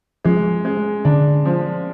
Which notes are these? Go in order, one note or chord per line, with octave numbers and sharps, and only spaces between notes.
F3 G#3
G#3
D3 D4
F3